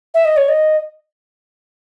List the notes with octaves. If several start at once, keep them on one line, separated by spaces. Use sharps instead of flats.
E5
D#5
C#5
D#5